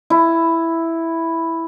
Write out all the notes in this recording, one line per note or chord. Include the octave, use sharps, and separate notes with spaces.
E4